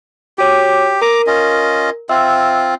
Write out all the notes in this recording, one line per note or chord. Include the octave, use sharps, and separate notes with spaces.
F#4 G4 C#5 D6
A#4 A#5 D6
C#4 F4 D#5
C4 F4 E5 E6